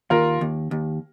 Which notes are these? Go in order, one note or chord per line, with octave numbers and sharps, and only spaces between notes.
D#2 F4 A#4
D#2
D#2